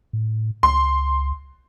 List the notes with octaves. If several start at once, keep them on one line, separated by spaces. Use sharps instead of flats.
A2
C#2 C6